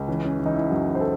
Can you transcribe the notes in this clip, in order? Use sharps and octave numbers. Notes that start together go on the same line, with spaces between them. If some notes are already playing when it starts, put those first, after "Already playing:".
Already playing: C#2
E3 C#4
C#4
E3
D#4
E4
F#2 F#4
C5
A4